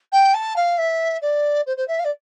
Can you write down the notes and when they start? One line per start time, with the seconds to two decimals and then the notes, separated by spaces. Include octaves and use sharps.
0.12 G5
0.34 A5
0.56 F5
0.78 E5
1.21 D5
1.66 C5
1.77 C5
1.87 E5
1.99 F5
2.04 D5